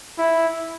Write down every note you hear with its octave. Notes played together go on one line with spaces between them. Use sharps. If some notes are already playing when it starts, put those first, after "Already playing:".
E4